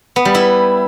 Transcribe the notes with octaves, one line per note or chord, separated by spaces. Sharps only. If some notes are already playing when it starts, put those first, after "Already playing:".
B3
G3
E4